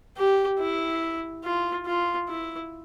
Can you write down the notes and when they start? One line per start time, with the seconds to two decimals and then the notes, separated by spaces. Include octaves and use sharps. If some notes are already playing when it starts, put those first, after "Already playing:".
0.17 G4
0.59 E4
1.44 F4
1.86 F4
2.28 E4